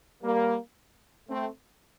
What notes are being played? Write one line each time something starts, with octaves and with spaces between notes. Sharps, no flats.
G3 A#3
A3 C4